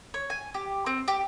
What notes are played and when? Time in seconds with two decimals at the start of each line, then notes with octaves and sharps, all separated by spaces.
0.14 C#5
0.30 G#5
0.54 G4
0.86 C4
1.08 G4